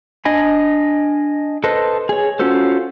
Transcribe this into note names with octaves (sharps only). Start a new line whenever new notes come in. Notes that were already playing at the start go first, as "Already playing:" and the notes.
D4 D#5 G#5 B5
A4 B4 C5 D#5
G#4 C#5
C#4 F4 F#4 A4 C5